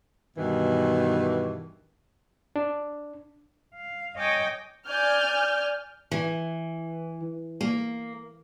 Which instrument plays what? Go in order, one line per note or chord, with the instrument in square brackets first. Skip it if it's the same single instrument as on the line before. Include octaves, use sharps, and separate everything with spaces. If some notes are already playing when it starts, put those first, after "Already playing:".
[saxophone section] G2 B2 D#3 E3
[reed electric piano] D4
[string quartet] F5
C#5 D#5 G5 G#5 D6
[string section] D5 G#5 F6 G6
[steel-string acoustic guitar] E3
A#3